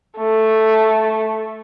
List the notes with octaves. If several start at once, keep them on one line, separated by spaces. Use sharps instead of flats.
A3